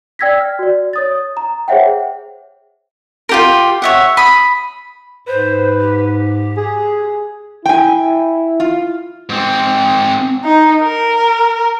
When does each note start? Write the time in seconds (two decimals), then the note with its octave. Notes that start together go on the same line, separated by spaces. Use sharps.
0.19 D5 G5 E6 G#6 A#6 B6
0.40 F6
0.59 F#4 D5
0.93 C#5 D#6 A6
1.37 A#5
1.68 G#4 C5 C#5 E5 F#5 G5
3.29 F4 G4 A#4
3.82 C#5 E5 F#5
4.17 B5 D#6
5.27 G#2 B4 C5
5.80 G4
6.57 G#4
7.66 E4 G5 G#5
8.60 F4
9.30 G#2 C4
10.45 D#4
10.83 A#4